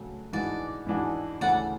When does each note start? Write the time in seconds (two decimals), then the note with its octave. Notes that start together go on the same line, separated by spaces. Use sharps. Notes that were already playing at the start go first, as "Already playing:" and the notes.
Already playing: C#3 F#3 A3
0.33 G#2 E3 G#3 D4 F#4 D5
0.87 G#2 E3 G#3 D4 F#4
1.41 D2 C#3 E3 A3 D5 F#5